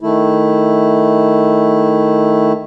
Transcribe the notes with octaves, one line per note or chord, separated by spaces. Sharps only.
D#3 A3 E4